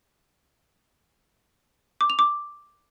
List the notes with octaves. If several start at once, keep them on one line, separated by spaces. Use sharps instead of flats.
D6
F7
D6